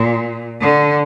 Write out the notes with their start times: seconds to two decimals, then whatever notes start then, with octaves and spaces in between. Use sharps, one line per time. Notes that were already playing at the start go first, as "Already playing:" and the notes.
Already playing: A#2
0.61 D3